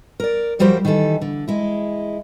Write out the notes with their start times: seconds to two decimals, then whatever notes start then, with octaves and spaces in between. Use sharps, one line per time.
0.20 A#4 D5
0.59 F#2 F3 G3 F#4 G4 C5
0.85 D#3 E3 G3 G#4 A4
1.21 D3
1.48 G#3 E4